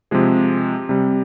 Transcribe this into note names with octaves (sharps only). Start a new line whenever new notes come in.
C3 F3 G#3 G#4
C3 G3